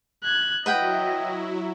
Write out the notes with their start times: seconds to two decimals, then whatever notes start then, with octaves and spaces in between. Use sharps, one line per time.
0.24 F#6 G#6
0.66 F#3 E4 B4 D#5 F#5 G5